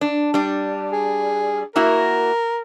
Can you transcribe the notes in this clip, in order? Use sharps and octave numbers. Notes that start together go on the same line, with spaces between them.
D4
G3 D4
G#4
A#3 E4 F#4 A#4